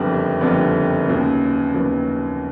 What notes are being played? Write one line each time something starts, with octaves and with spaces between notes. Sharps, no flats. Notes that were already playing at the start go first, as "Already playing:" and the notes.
Already playing: F#1 F2 D3 G3 B3
F#1 F2 D3 G3 B3
D#2 C#3 F#3 B3
D#2 C#3 F#3 B3